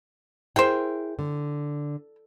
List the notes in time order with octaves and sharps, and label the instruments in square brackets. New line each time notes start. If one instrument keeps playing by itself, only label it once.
[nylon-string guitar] E4 G#4 A#4 [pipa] C5 G5
[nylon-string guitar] D3